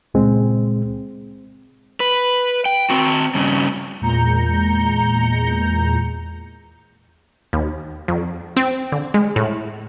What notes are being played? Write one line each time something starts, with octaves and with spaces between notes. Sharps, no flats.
C#2 A#2 G#3 C4
B4
G5
C4 F#4
G2 C#3
E2 A#2 G#3 A#5 G6 C#7
D#2
F2
C4
D3
G#3
A2